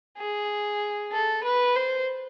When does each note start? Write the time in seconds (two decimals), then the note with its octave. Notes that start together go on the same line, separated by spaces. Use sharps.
0.18 G#4
1.12 A4
1.44 B4
1.75 C5